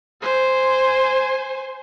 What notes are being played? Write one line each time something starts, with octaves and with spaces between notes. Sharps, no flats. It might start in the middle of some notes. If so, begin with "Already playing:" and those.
C5 G#5